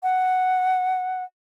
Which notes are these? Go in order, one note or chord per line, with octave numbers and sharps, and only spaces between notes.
F#5